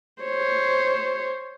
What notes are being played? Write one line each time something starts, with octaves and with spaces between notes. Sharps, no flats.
C5 C#5